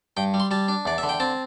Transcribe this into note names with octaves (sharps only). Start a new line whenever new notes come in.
G2 G5
G3
C6
G3 A5
D4
E2 D5
E5
D3
G5
C4 A5